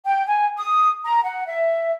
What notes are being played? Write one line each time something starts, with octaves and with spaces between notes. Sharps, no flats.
G5
G#5
D#6
A#5
F#5
E5